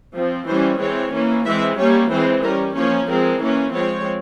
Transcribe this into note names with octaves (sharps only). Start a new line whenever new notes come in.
F3 C4
E3 G3 C#4 C5
E3 G#3 C4 C#5
E3 A#3 C#4
E3 G#3 C4 E5
G3 A#3 C#4 C#5
E3 G#3 C4 C5
G3 C#4 A#4
F3 A#3 C#4 C#5
F3 G#3 C4 A#4
E3 A#3 C#4
F3 G#3 C4 C#5